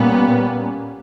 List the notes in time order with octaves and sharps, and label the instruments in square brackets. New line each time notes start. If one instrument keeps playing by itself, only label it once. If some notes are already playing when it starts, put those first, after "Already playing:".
Already playing: [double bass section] A#2 G3 A#3 C#4 [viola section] B3